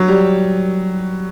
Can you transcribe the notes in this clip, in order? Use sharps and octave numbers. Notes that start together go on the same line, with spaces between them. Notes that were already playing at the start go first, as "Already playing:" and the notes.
Already playing: F#3
G3